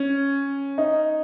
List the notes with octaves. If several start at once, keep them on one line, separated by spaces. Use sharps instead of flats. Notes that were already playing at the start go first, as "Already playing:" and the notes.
Already playing: C#4
D#4